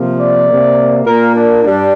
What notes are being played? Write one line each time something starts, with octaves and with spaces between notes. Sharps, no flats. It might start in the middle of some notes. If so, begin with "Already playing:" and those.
Already playing: C3 F3 A#3
D5
C3 A#3
A#2 A#3 A#4
D4
G2 G3 D4